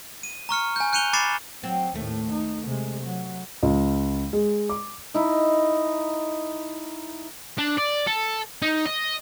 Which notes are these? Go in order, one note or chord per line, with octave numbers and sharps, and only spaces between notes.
D#7
A#5 C#6 F6 C#7
G#5 G6
F#6 G6 C#7 D#7 F7 G7
B5 D6 A6 C7 C#7 E7
F#3 C4
D#2 A2 A3
D#4
C3 G#3
F#3
C#2
G#3
D6
D#4 E4
D4
D5
A4
D#4
D#5